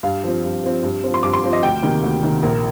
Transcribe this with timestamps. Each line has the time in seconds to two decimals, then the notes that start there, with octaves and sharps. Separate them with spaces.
0.03 G2 F5
0.24 F3 C4
0.44 G2
0.64 F3 C4
0.83 G2
1.04 F3 C4
1.14 C6
1.23 G2 D6
1.33 C6
1.43 F3 C4
1.53 D#5
1.63 D2 G5
1.82 C3 D#3 A#3
2.02 D2
2.23 C3 D#3 A#3
2.43 A#1 A#4